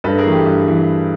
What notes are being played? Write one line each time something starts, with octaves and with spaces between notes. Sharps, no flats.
G2 A4 B4
G#4 A#4
E3 A3
G4
G2
E3 A3